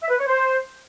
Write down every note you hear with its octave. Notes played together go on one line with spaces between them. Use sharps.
E5
B4
C#5
C5